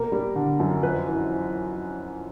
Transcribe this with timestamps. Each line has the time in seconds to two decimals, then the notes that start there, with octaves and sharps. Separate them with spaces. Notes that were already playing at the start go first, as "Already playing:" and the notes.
Already playing: B2 A#3 A#4
0.12 G3
0.36 D3
0.60 F#2
0.83 F2 B4
1.06 E3